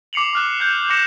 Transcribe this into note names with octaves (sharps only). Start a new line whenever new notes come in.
D6 C7 C#7 F7 F#7
D6 F6 F#6
F#6 G6
D6 F#6 A#6 C#7 E7